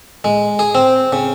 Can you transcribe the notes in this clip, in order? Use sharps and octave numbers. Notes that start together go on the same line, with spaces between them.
G#3
G#4
C4
C#3